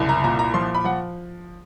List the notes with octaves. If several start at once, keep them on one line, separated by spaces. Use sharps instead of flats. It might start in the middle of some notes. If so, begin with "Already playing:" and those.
Already playing: F#1 C2
A#5
A#2 A#5
A#5
F3 C6
B5
F3 F#5